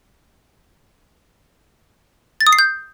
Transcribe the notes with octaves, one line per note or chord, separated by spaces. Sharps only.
A6
D#6
C7
G6